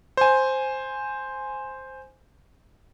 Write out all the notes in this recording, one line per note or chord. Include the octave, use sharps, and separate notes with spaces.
C5 G#5